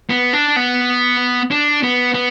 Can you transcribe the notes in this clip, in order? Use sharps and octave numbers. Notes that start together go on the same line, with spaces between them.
B3
D4
B3
D4
B3
B3